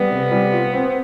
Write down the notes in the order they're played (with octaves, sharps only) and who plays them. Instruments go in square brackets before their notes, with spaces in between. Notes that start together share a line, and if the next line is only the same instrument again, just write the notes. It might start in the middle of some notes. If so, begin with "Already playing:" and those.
Already playing: [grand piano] G3 [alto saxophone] B3
[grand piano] C3
G3
F4
C4